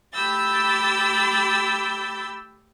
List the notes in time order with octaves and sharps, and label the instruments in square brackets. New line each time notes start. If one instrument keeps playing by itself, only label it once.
[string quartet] A3 G4 B5 E6 G6 A6